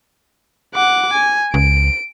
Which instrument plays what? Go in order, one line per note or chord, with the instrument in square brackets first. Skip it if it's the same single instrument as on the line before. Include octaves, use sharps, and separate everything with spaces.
[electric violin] F#5 D6
G#5
[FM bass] C#2 [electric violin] D7